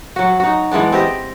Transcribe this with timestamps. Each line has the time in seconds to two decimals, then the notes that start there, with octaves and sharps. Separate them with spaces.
0.16 F#3 F#4
0.40 D#4 F#4
0.71 E3 G#3 B3 D4
0.92 C4 G4 D#5